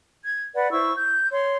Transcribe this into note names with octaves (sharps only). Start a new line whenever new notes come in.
G#6
B4 D5 F#5
E4 C5 C#6 E6
G6
C#5 C6